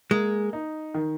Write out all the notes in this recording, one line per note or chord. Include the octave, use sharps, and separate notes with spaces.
G#3 A#3
D#4
D#3